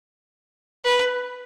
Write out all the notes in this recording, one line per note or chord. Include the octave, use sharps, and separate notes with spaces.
B4